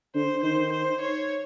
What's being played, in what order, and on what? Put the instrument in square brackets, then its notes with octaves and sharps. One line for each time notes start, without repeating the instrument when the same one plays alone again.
[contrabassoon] D3 [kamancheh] C5
[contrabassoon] D#3 [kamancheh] C5
[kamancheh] C5
C#5